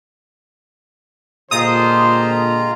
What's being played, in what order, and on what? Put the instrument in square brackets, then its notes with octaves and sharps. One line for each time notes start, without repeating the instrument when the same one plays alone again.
[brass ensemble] A#2 D3 G4 [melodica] G#3 F4 A#5 [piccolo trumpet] C5 [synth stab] D#6